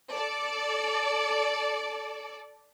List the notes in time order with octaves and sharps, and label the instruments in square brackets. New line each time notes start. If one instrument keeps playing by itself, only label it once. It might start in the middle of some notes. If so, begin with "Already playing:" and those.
[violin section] A4 D5